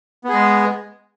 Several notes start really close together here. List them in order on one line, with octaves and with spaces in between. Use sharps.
B3 G#4 G#3